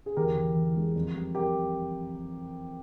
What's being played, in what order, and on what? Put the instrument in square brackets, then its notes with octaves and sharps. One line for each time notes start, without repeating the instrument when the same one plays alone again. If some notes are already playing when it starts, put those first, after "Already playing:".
[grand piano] G#4
E2 G4 A#4
E3
E3
G#3
F2
G3
G4 A#4